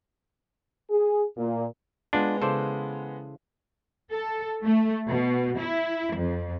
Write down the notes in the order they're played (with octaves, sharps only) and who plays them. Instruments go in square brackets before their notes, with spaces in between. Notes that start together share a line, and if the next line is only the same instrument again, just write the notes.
[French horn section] G#4
A#2
[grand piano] G#3 B3 [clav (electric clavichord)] D4 F4
[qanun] C#3 E3 [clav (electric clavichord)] A4 C5 D5
[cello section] A4
A3
B2
E4
F2